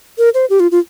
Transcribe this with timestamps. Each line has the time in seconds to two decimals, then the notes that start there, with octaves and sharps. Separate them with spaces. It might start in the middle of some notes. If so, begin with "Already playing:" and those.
0.18 A#4
0.34 C5
0.50 G4
0.60 F4
0.72 F4